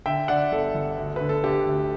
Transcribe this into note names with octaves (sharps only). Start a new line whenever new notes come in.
D3 E5 G5
D3 D5 F#5
G1 A4
G1
D2
D3 B4
A4
D3 G4
D2